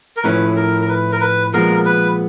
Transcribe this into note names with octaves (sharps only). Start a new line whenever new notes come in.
A#4
A2 F3 A3 C#4 E4 B4
A#4
A#4
B4
A#4
B4
A#2 F3 G#3 B3 A#4
B4